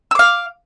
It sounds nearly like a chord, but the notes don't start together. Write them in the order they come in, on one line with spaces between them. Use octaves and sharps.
E6 D6 F5